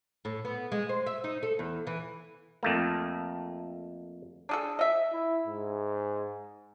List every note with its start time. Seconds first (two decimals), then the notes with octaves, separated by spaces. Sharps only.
0.25 A2
0.45 B3
0.72 G#3
0.89 C5
1.06 E5
1.24 D#4
1.43 A4
1.59 E2
1.87 E3
2.63 F2 A3 A#3
4.49 D4 G#4 A4
4.79 D#5 E5
5.13 E4
5.47 G#2